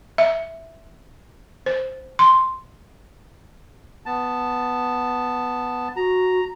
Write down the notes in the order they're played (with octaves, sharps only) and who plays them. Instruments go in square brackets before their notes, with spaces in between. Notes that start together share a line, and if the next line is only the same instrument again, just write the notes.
[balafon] E5
C5
C6
[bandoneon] B3 A5
[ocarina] F#4 [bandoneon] A#5